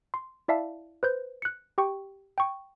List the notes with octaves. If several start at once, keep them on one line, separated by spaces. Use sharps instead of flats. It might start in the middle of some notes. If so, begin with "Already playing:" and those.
C6
E4 D5 E5 F5 A5
B4 C5 G6
F#6 C#7
G4 G5 C#6
G5 C#6